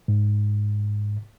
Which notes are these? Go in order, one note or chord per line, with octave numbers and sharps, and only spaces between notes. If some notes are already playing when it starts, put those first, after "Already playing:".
G#2